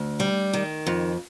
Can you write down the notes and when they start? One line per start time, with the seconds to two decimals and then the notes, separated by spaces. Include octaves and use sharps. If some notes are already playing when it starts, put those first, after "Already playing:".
Already playing: D2
0.20 G3
0.53 D#3
0.87 F2